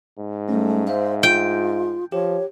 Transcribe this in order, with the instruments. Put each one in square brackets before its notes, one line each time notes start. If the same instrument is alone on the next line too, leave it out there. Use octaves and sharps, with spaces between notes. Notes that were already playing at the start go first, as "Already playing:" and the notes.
[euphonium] G#2
[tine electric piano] G3 C#4 [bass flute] A3
[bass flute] C5 [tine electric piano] E5 F5
[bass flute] F4 [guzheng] G5
[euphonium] F3 [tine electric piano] G4 [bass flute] C#5